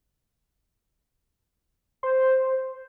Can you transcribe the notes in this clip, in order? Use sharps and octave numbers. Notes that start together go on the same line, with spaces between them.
C5